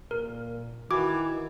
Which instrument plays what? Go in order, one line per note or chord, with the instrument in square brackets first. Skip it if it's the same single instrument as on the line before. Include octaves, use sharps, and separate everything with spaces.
[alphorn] A#2 [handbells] A#4
[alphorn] D#3 [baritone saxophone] E3 [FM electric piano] F#4 G#6 [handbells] D6